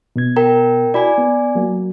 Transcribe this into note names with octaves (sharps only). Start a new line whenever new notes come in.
B2 B3 G#6
A#4 G5 A#5
E4 F#4 D5 G#5 B5
B3
F#3 A#3 F#4